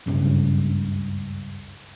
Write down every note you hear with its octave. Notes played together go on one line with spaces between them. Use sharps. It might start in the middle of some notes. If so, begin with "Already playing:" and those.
F#1 C#2 G2 C#3